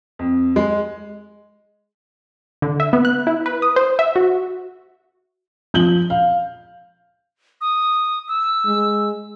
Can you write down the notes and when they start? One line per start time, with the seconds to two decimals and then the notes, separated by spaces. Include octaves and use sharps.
0.19 F2
0.56 G#3
2.62 D3
2.80 E5
2.93 B3
3.05 F#6
3.27 E4
3.46 B4
3.62 D#6
3.76 C5
3.99 E5
4.16 F#4
5.74 F3 G6 F#7 G7
6.10 F5
7.61 D#6
8.28 E6
8.66 G#3